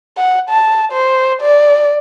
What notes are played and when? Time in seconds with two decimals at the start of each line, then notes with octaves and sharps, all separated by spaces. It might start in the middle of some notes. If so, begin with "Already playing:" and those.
0.17 F#5
0.49 A5
0.92 C5
1.41 D5